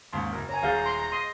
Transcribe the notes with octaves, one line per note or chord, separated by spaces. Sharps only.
D#2 G#2 C#3 C6
F#1 A#4
C#5 G#5 A#5
D#1 G#4 F5 F#5 G6 A6
C6
D#5 C6